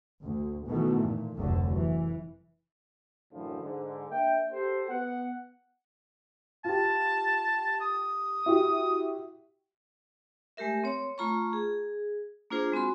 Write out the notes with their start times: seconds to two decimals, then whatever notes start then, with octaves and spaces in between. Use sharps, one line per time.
0.21 D2
0.66 B2 D#3 E3 A3
1.00 A#2
1.35 F1 D2 D3 F#3 A3
1.75 E3
3.33 F#2 A2 D3 E3 F3
3.62 G#2 D3
4.11 A#3 D4 E5 G5
4.52 G4 A4 C5
4.89 B3 F#5
6.65 F4 G4 A5
7.81 D#6
8.46 E4 F#4 G4
10.57 G#3 A3 G4 A#4 E5
10.84 C4 C#5
11.18 A3 F4 A#5 B5 C#6
11.53 G#4
12.50 A#3 D4 F4 G#4 C5
12.72 G#3 C4 F#4 B5 C6